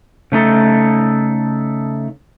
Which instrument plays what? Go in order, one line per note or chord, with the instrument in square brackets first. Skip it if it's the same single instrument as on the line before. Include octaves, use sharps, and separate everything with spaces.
[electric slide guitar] C#3 A3 D#4 A4